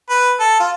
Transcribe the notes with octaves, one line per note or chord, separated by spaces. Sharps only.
B4
A4
F4